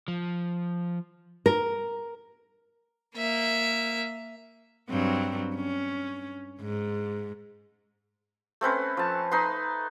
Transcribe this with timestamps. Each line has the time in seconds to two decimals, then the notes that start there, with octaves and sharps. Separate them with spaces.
0.08 F3
1.46 A#4
3.16 A#3 E5
4.90 G2 F#3 C4
5.56 C#4
6.61 G#2
8.61 A3 C4 C#4 B4
8.97 F3 A5
9.32 D#4 B4 C6